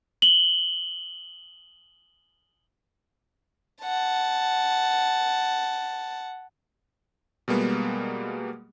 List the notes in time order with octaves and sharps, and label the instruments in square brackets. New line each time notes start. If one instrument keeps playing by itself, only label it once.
[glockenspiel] F#7 G7
[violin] F#5 A5
[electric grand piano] B2 G3 G#3 A#3 B3